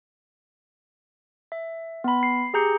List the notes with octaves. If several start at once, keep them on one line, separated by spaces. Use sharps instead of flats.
E5
B3 B5
C7
G4 G#4 A#5 G6 C#7